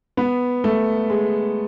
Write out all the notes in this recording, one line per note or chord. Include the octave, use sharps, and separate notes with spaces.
B3
A3
G#3